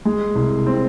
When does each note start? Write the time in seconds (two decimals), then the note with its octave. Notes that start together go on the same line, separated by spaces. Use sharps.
0.05 G#3
0.35 C2
0.67 C4